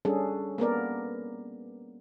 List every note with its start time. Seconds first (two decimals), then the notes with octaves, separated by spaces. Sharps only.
0.05 G3 C#4 D4 G#4 A4
0.58 A#3 B3 A#4 D5